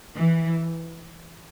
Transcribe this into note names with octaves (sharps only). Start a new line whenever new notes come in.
E3